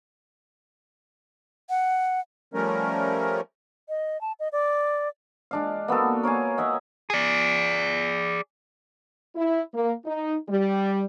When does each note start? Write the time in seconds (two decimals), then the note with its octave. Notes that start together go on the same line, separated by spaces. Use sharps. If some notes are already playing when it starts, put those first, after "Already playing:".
1.70 F#5
2.54 F3 G3 A3 C#4 A#4
3.89 D#5
4.21 A5
4.40 D#5
4.52 D5
5.51 G#3 D4 F5
5.88 A#3 B3 F#4 A4
6.23 A#4 C#5 F5 G#5
6.58 C#5 D#5 E5 F#5
7.10 G#4 D5
9.35 E4
9.73 A#3
10.05 D#4
10.49 G3